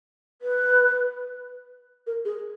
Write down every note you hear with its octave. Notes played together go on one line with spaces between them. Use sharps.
B4
A#4
G#4